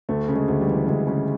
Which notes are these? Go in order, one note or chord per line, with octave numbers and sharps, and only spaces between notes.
D2 A3
C#3
G#3
D2
G3
E3
D2 G#3
C#3